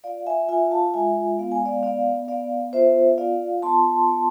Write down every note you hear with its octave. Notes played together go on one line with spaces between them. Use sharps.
F4 D5 F5
E5 G#5
F4 E5 G#5
F5 A5
G#3 E5 G#5
B3 F5
G#5
D5 F5
B3 D5 F5
B3 D5 F5
F4 C5 E5
F4 D5 F5
B3 A5 C6
B3